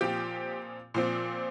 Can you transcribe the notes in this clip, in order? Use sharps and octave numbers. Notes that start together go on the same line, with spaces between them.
A#2 F3 C4 G4
A#2 F3 C4